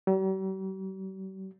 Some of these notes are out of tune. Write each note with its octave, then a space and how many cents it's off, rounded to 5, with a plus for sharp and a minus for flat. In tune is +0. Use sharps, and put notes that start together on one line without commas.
G3 -45